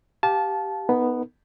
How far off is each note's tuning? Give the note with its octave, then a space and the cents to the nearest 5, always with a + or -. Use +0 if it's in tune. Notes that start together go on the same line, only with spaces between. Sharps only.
G4 +0 F5 +15 A5 -20
B3 +0 D#4 +0 A#4 -45